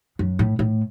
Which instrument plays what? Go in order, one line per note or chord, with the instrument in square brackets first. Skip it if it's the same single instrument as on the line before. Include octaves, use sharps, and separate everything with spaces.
[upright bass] F#2
A2
A2